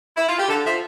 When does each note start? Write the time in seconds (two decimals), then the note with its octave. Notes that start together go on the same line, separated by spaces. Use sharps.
0.17 E4
0.28 F4
0.39 G4
0.49 D3 A4
0.65 F3 E5